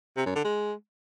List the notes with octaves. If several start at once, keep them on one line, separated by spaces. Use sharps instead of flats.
C3
F#2
D3
G#3